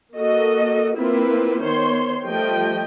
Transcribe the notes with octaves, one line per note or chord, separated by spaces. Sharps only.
A#3 F#4 A4 D#5
A#3 C4 E4 F4 B4
D#3 B3 C5 C#5 C6
F3 G3 A3 D#5 G5